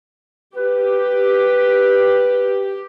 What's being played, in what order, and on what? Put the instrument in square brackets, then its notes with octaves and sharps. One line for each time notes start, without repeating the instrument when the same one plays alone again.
[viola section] G4 [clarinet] B4